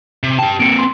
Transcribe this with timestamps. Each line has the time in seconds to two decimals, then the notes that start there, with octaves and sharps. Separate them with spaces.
0.23 C3
0.39 G4 G5 A5
0.60 A#3 C4 C#7 D7
0.79 C6